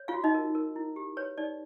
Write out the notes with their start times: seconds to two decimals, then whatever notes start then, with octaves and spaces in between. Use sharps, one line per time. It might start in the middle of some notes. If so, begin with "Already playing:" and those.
Already playing: C#5
0.08 F4 F5
0.14 F#4
0.24 D#4 D#5
0.34 A#4
0.55 A#4
0.76 E4
0.96 G4
1.17 B4 C#5
1.38 D#4 D5